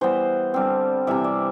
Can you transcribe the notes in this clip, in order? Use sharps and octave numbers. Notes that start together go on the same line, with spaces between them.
E3 G3 B3 C5
D3 G3 C4
C3 E3 G3 E5
D5